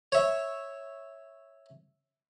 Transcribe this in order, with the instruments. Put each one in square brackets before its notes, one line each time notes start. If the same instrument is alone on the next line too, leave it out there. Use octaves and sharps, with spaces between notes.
[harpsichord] C#5 E5